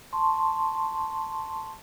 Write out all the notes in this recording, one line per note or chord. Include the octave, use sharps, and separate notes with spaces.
A5 C6 C#6